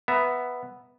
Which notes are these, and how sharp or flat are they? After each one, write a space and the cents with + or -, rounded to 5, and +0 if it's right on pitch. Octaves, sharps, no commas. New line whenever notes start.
B3 +0 E5 +5 A#5 +0